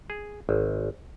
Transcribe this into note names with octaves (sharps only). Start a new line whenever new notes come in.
G#4
G#1